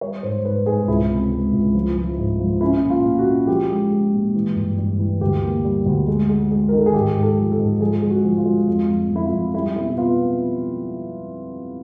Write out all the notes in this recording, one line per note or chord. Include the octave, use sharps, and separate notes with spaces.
G3 C#5
G#2 C5
G#2 B4
G#2 G#4
C#2 E4
C3
G#3
C#2
F3
F3
G#2
F3
C#4 E4
A#2
F4
A#2
F#4
C#4
F3 G4
G#3
G#3
A#2
E3
G2
G2
E3
D2 G4
A#3
G3
D2
G#3
G#3
G#3
A#4
D#3 A4
G#4
G#2 G4
G#2
A4
F3
A4
G#2
F3 G#4
G#3
F#4
F3
F4
G#3
F2 F4
F2
F2
E4
F4
F2
G3 E4
B2 E4
B3 F4